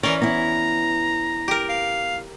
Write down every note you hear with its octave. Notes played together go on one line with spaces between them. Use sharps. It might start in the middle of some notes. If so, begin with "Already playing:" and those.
E3 C#4 A#4 D5
B3 E4 A#5
G4 A#4
F5